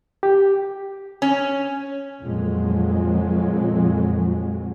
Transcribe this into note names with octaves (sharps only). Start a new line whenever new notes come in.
G4
C#4
F2 A#2 C#3 F3 F#3 G#3